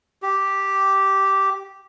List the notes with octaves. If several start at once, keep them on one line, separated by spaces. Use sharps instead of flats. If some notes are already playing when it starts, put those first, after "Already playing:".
G4